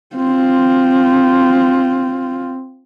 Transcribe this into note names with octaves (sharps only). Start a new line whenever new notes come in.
C4 F4